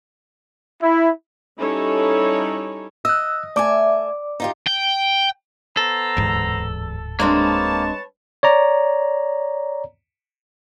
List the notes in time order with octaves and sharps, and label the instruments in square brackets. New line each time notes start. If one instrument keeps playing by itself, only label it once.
[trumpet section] E4
[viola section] G3 C#4 D#4 E4 A4 C#5
[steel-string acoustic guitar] D#5 [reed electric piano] E6 F#6
[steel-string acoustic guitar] A3 E5 G#5 [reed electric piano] D5 D6
[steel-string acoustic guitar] D#4 F4 G4
[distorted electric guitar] G5
[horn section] B3 C5 A#5 [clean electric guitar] A4
[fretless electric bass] D1 G#2 [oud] E2
[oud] G#3 C4 D4 [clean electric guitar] A#3 [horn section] B4 C#5 A5
[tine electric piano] C#5 D5 A#5